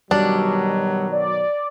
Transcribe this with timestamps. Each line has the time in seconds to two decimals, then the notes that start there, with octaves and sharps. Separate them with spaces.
0.11 B2 D#3 F#3 G3 D4
1.11 D5